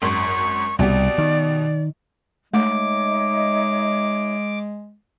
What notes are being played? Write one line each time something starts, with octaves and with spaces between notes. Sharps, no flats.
G#1 F#2 C6 C#6
C2 B2 G4 D5
D#3
G#3 A3 D#4 C#5 E5 D6